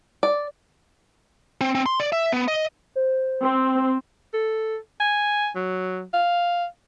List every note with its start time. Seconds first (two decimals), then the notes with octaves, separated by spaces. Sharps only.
0.23 D5
1.61 C4
1.75 C4
1.86 C6
2.00 D5
2.12 E5
2.32 B3
2.48 D#5
2.96 C5
3.43 C4
4.34 A4
5.00 G#5
5.56 F#3
6.14 F5